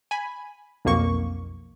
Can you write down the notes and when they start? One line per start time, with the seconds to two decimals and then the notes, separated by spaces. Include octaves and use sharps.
0.11 G#5 B5
0.85 B1 F2 A#3 C#6